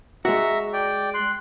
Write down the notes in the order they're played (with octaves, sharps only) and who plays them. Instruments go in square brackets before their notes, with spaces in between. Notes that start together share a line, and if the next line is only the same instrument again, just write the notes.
[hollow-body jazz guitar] G#3 F#4 [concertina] E5 A#5
[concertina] D5 G5
C6 F#6